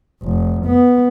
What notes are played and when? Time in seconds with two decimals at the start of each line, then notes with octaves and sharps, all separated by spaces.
0.23 F1
0.67 B3